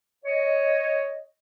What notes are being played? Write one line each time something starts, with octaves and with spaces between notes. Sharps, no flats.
C#5 D#5